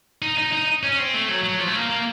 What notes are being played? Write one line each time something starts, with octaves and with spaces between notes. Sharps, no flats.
D#4
D#4
D#4
C#4
C4
A3
F#3
F#3
F3
A3
A#3
A#3